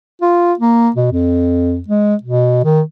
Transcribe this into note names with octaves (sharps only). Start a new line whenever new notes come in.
F4
A#3
B2
F2
G#3
B2
D#3